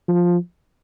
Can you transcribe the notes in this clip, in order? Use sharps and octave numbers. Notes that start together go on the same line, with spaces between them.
F3